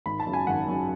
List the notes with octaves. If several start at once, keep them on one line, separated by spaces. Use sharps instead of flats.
G#1 B5
A5
F#2 C#3
G#5
G#1 F#5
F#2 C#3